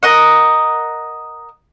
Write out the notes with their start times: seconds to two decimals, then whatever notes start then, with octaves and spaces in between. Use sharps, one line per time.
0.03 A#4 D#5 F#5